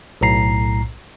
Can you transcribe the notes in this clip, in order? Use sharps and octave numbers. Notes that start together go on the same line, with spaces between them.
B1 A2 A#5 C7